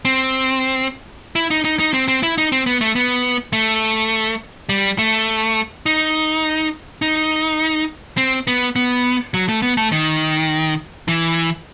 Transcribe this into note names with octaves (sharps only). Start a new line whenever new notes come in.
C4
E4
D#4
D#4
D#4
C4
C4
E4
D#4
C4
B3
A3
B3
A3
G3
A3
D#4
D#4
C4
B3
B3
F#3
A3
B3
A3
D#3
E3